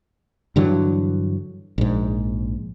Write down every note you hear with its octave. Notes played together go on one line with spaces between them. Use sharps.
G2 D3 E3 F#3
A#1 G#2